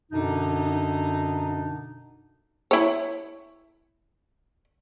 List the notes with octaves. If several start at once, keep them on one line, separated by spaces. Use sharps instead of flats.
F#2 B2 D3 D4 D#4
E4 C#5